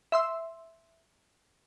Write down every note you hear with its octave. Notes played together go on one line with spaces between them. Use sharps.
E5 C6 E6